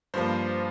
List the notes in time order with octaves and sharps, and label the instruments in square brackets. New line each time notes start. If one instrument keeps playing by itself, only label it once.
[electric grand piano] G2 F3 A#3 C5